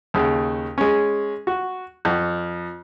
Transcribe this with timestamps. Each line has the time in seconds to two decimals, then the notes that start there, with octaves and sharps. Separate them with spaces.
0.14 D#2 C#3
0.78 G#3 C#4
1.47 F#4
2.05 F2